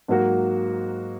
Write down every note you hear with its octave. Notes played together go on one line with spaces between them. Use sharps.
G#2 F#3 A#3 F#4